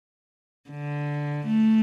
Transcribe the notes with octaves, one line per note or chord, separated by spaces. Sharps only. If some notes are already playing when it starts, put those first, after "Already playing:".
D3
A3